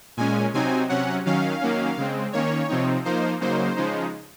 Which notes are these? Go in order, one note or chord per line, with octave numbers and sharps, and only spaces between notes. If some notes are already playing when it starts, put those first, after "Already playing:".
A#2 G#3 C#4 G#5
C3 F#3 C4 D#4 G#5
C3 F#3 C#4 F#5
D#3 F#3 C#4 F5
D#3 F#3 A#3 C#4
C#3 G#3 C4
D#3 A#3 C#4 C#5
C3 F3 C4 D#4
F3 A#3 D#4 C5
C#3 F#3 A#3 D#4 C5
C#3 F3 G#3 D#4